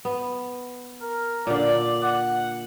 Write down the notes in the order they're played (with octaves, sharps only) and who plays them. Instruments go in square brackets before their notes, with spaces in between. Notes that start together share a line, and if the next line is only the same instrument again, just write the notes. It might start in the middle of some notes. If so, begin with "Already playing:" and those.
[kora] B3
[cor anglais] A#4
[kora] A#2 D3 [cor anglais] D5
[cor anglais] F#5